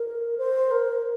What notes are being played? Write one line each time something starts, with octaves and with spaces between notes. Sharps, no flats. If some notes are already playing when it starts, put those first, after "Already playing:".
Already playing: A#4
C5
A#4